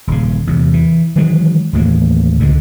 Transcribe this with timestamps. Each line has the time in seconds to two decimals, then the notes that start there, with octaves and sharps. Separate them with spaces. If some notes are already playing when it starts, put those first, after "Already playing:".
0.07 D#1 C#3
0.47 E2 C3
0.74 E3
1.16 D#3 E3 F#3 G#3
1.73 D#2 A2 E3 A#3
2.39 C#2 D3 G#3